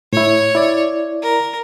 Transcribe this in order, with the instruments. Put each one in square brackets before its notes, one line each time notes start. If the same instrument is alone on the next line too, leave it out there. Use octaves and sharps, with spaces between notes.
[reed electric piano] A2 E4 [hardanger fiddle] C#5
[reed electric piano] E4 D5
[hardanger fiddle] A#4